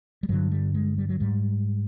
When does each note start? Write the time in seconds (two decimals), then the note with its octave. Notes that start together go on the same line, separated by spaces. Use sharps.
0.23 G3
0.29 G2 D3 F#3
0.52 G3
0.74 G#3
0.98 G3
1.09 F#3
1.20 G#2 G3